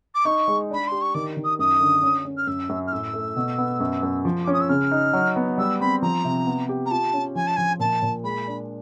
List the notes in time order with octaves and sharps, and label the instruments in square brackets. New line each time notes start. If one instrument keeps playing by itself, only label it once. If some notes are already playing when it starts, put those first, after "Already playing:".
[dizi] D6
[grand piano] D#4 [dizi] C#6
[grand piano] G#3
[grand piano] D4 [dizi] B5
[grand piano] G4 [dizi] C6
[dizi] C#6
[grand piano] D#3 [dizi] D6
[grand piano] D#3
[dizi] D#6
[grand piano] F#2 [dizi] D#6
[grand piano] D3
C#4
C#4
[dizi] F6
[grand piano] F#2 [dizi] E6
[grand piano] F#2
[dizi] F6
[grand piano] A2 [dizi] E6
[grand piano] A3
B2
B3
F#2
F#2
F3
[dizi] D6
[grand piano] C#4
[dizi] D#6
E6
[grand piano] C#3 [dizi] F6
[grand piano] D#4
F#3
B3
[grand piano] G3 [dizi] E6
[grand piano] C4 [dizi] B5
[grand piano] F3 [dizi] A#5
[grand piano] C3
B3
G4
[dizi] A#5
[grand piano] F4 [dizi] A5
[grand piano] C#4
[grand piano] F3 [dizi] G#5
[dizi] A5
[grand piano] F3 [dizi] G#5
[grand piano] A#2 [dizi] A5
[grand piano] A#2
[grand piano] G#3 [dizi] B5
[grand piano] D4